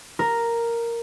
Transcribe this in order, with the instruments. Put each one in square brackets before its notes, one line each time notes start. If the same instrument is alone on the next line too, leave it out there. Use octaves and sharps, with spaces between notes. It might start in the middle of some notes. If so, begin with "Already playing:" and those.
[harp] A#4